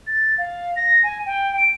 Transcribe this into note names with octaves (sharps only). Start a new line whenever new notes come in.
A6
F5
A#6
G#5
G5
D7